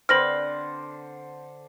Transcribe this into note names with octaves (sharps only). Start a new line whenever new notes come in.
D3 C4 B4 C5 F6 A#6 F#7